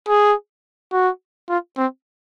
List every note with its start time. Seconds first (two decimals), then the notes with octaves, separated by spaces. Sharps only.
0.08 G#4
0.92 F#4
1.49 F4
1.77 C4